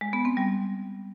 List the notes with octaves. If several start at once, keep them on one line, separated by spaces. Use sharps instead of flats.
G#3
B3
C4
G3